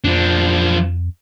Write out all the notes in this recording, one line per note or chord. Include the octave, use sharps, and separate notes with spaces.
F2 F3 D4